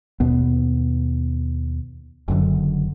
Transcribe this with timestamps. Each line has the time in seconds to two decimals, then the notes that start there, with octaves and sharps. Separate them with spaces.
0.20 D#2 B2 B3
2.28 F#1 F#2 D3 F#3